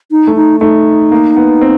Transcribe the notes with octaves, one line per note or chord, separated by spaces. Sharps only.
D#4
A3
D#4
A3 D#4
A#3
B3
C4